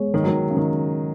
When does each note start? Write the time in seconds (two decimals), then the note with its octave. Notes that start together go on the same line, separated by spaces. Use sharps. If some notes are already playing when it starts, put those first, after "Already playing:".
Already playing: G#3 B3 G#4 C#5
0.14 D#3
0.24 F#3
0.28 D#3
0.50 C#3
0.57 D#3